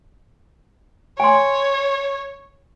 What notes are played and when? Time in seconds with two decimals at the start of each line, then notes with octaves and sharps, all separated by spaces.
1.20 C#5 G#5 C6